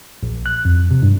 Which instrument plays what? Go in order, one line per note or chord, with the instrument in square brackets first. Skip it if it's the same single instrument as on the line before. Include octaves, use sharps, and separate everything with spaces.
[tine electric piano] A#1
F#6
F2
C3
G2